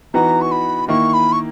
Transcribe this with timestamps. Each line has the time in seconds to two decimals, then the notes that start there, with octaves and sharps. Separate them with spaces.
0.14 E3 B3 D#4 F#4 B4 A#5
0.41 C#6
0.51 B5
0.88 D#3 A#3 E4 C#6
1.13 B5
1.32 C#6